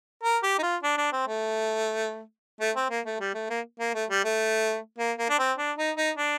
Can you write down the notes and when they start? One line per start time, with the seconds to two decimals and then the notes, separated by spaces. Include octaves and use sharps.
0.23 A#4
0.43 G4
0.59 D#4
0.62 F4
0.83 D4
0.98 D4
1.12 C4
1.27 A3
2.60 A3
2.76 C4
2.90 A#3
3.06 A3
3.20 G3
3.34 A3
3.50 A#3
3.80 A#3
3.94 A3
4.10 G3
4.24 A3
4.98 A#3
5.18 A#3
5.30 D4
5.39 C4
5.58 D4
5.78 D#4
5.97 D#4
6.18 D4